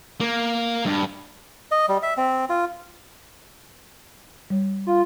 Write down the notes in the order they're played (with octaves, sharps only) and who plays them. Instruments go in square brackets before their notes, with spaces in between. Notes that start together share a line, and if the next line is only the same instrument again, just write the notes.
[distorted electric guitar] A#3
G2
[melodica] D#5
G3
E5
C4
F4
[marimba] G3 C#5
[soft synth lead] F4